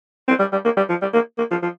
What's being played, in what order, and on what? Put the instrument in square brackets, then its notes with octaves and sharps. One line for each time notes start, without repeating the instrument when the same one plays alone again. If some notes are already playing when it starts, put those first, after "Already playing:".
[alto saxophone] C4
G3
G3
A#3
G3
F3
G3
A#3
A#3
F3
F3